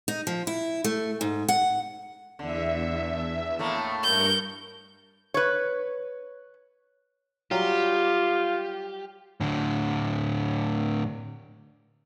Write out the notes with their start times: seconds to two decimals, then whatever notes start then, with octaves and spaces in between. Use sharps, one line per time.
0.08 D#4
0.27 F3
0.47 E4
0.84 A3
1.21 G#2
1.48 F#5
2.39 E2 D3 E5
3.59 A2 A3 A#3
4.03 G2 A#4 C#6 G6
5.34 B4 C#5
7.51 F#3 G3 F4 G4
9.41 A2 D3